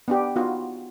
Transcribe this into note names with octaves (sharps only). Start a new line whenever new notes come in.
B3 D4 G4
B3 D#4 F4 F#4